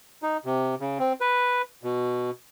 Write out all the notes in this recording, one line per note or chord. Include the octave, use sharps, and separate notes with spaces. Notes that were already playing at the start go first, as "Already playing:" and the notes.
D#4
C3
C#3
C4
B4
B2